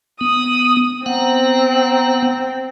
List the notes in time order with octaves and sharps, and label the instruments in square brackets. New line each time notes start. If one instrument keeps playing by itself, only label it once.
[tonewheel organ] B3 [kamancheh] D#6
[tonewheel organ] B3 F#5 A#5 [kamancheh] C4